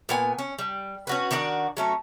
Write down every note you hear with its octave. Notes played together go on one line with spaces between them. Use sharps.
A#2 B3 G#5
C#4
G3
C#4 F#4 B4
D#3 D4 F#4 D5
F#3 A3 C#4